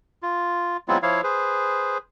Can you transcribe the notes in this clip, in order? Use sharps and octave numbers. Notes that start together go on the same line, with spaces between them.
F4
F#3 G#3 B3 C4 E4 F4
F3 E4 C#5 F5
G#4 B4 C5